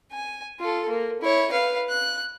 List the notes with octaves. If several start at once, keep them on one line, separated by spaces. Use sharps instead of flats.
G#5
F4 A4
A#3
E4 C#5
B4 F5
F#6